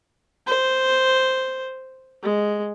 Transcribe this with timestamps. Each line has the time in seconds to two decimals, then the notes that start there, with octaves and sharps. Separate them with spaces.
0.47 C5
2.23 G#3